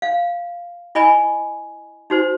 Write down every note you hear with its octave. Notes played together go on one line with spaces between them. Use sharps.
F5
E4 D#5 G#5 B5
D#4 F#4 C5